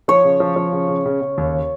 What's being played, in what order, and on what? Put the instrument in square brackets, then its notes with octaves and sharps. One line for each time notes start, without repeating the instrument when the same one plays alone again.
[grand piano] F3 [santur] C#5
[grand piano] C#3
F3
F3
C#3
C#3
C#3
C#3
D#2